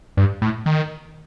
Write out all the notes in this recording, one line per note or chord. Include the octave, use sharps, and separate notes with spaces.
G2
A2
D#3